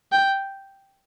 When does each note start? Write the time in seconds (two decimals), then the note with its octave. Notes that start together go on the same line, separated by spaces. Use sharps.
0.12 G5